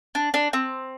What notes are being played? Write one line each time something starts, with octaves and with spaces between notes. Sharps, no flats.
D4
D4
C4